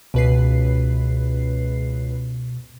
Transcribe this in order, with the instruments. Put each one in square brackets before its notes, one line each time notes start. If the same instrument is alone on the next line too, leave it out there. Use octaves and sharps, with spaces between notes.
[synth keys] C#2 B4 C7 [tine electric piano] B2